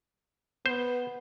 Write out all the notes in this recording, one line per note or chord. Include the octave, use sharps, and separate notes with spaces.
B3 C5